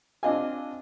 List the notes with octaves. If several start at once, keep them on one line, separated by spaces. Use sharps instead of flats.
C4 D4 F4 D#5 F5 G#5